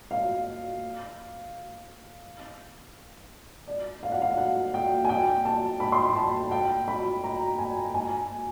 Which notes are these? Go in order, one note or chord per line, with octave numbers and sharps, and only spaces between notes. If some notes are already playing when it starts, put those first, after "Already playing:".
F5
D5
F5
F#5
F5
F#5
G5
G#5
G5
A5
B5
C6
B5
A5
G5
B5
A#5
G#5
G#5